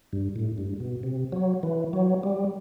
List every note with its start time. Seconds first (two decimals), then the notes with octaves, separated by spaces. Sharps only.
0.13 G2
0.36 A2
0.58 G2
0.80 B2
1.03 C3
1.32 F#3
1.63 E3
1.93 F#3
2.23 G3